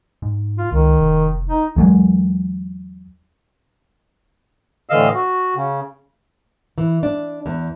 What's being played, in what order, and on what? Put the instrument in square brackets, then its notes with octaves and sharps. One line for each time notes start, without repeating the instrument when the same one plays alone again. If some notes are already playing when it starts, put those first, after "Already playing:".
[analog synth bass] G#2
[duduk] F4
[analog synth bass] C#2 [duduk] D#3
[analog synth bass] F1
[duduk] D#4
[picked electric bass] E2 F#3 G#3
[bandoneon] A2 D3 E3 D#5 F5 E6
F#4
C#3
[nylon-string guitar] E3
D4
E2